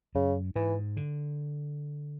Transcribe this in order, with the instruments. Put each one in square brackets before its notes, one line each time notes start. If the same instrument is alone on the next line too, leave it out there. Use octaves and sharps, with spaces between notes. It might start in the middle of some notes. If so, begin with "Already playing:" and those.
[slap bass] F#2 [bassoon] C#3
[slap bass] G#2 [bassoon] E3
[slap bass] D3